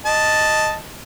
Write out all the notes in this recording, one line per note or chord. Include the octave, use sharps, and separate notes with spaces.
D#5 A5